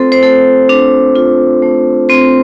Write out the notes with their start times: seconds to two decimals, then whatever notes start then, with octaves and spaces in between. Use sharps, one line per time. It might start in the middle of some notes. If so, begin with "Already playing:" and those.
Already playing: A3 C4 F4 A4 C5
0.12 C5
0.23 A3 A4
0.69 D4
1.16 F4
1.63 A3
2.09 C4 F4 C5